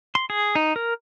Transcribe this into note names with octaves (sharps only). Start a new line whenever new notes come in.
C6
G#4
D#4
A#4